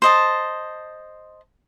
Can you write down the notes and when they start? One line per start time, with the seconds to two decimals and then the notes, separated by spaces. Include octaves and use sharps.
0.02 C5 D#5 A5